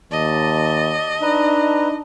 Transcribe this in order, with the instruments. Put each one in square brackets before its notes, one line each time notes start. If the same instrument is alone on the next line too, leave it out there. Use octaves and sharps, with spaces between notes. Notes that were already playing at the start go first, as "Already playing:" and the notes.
[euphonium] D#2 [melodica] D5 A5 [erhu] D#5
[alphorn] D4 [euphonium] D#4 [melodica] B4 A#5